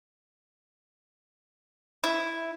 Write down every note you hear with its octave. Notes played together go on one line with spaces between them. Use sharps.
E4